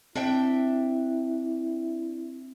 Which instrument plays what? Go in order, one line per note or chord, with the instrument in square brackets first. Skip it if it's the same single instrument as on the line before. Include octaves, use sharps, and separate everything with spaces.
[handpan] C4 [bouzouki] D4 E5 G5 [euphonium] E4